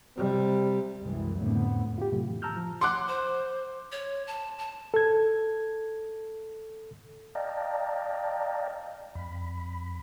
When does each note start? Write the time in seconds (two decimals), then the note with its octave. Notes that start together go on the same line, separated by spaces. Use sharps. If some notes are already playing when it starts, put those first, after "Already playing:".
0.16 C3 G3
1.02 C2 F#2 E3 G#3
1.41 F2 A2 D3 A3 B3
1.98 F4 G4
2.12 F2 A2 C3 F#3 A3
2.28 A2 E3
2.42 A5 A#5 E6 F6 G6
2.56 F3
2.81 F#5 C6 D6 F#6
3.08 C5
3.92 C#5
4.27 A5
4.59 A5
4.94 A4 G#6
7.35 D5 D#5 F5 G5 A5 A#5
9.15 F2 B5